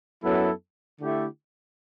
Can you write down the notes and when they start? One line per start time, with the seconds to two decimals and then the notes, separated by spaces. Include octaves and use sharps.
0.24 F#2 F#3 B3 E4 A4
1.01 D3 A3 E4 G4